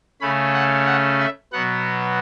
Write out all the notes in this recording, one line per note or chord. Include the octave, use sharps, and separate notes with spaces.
C#3 A3 C#4 B5
F#5
F#5
E5
B2 F#3 B3 F#5